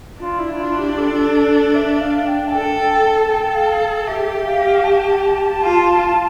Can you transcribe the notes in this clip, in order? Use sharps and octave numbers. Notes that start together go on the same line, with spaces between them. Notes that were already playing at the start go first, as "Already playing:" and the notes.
D4 F4
E4
F4
G4
A4
E5
F5
G5
A5
A4 G5
A5
A4 G5
F5
G4 E5
F5
F5
A5
F4